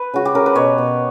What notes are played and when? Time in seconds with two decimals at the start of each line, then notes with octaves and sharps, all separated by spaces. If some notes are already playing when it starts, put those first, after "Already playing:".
Already playing: B4
0.14 C#3 F#4
0.25 G4
0.35 C#3 A#4
0.46 B4
0.56 B2 C#5
0.78 B2